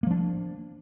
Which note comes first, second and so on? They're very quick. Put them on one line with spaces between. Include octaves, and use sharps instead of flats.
A#3 F3 D4